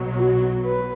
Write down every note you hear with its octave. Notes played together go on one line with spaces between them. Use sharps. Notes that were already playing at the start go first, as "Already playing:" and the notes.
Already playing: B1 B2 F#3
F#4
B4